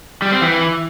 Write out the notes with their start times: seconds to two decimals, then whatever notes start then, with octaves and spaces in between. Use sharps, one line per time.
0.22 G3
0.32 C4
0.42 E3